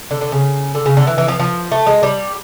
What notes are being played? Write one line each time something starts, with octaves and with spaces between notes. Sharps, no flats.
D3
D3
C#3
D3
C#3
D3
E3
E3
F3
F3
A3
G#3
G3